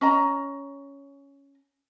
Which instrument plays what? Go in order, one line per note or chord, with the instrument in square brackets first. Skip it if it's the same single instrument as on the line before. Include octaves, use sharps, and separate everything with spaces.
[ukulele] C#4 D#5 A#5